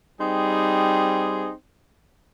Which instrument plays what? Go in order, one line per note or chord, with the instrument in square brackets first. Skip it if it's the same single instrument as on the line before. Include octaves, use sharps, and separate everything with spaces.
[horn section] G3 C4 D#4 G#4